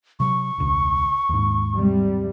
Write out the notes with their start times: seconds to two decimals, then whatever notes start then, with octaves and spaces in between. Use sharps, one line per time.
0.20 C3 F#3 C#6
0.58 E1 C#2
1.29 D#2 G#2
1.75 C3 G3